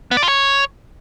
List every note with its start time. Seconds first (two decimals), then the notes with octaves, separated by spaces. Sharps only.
0.11 B3
0.17 D5
0.23 F4
0.28 C#5